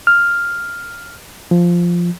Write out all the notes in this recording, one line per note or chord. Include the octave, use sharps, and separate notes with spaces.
F6
F3